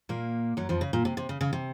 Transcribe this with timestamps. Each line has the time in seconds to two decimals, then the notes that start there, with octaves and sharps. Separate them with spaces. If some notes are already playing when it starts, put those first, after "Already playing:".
0.09 A#2 A#3
0.57 F#2 F#3
0.69 F2 F3
0.81 C#3
0.93 A#2
1.05 C3
1.17 C3
1.29 C#3
1.41 C#3
1.53 C3